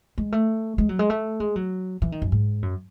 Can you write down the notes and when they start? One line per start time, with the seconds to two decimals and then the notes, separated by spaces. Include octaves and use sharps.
0.18 G#3
0.32 A3
0.78 G#3
0.89 F#3
0.99 G#3
1.10 A3
1.40 G#3
1.56 F#3
2.02 E3
2.12 D#3
2.22 F#2
2.32 G#2
2.62 F#2